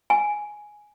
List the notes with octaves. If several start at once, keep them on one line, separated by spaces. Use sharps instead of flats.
G#5